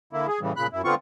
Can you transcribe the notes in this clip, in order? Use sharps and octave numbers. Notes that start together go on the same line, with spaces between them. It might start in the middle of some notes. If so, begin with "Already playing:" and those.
D3 A#3 E4
G#4
A2 C#3 E3 G3
A#2 C#3 B5 F#6
F#2 E4
D3 B3 C4 F4 C#6